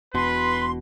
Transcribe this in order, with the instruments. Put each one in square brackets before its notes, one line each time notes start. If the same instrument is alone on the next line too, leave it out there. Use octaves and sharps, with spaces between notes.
[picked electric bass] E1 B2 [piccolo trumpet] B4 [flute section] C6